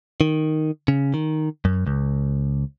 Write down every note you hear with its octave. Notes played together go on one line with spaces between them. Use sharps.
D#3
C#3
D#3
F#2
C#2